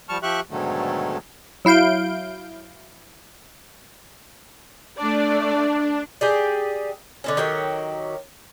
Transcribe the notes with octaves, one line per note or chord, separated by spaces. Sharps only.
F3 G3 A5 C#6 F6
F3 G4 E5 C#6 F#6
G#2 B2 D3 D#3 F#3 A3
F#3 E4 F5 G6 D7
A3 D4 D5
G4 G#4 D5
D3 C4 C#4
D#3 F#3 G4 C#5